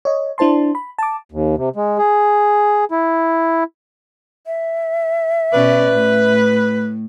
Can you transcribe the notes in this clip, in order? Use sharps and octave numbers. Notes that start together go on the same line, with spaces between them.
C#5 D#5
D4 E4 C5 A5 C6
B5
A5 D6
D#2
C3
G#3
G#4
E4
E5
B2 C#4 B4 D5
A2